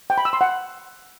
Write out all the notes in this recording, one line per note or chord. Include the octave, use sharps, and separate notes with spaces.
G5
B5
E6
C6
F#5